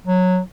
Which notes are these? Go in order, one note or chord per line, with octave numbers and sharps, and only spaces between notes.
F#3